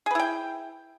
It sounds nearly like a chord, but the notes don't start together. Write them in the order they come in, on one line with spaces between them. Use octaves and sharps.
G#4 B4 E4 G5